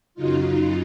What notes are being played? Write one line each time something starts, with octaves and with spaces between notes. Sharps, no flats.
F#2 C#3 F#3 D#4 F4